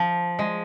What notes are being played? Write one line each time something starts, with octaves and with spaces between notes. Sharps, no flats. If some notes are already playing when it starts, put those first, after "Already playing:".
Already playing: F3
G#3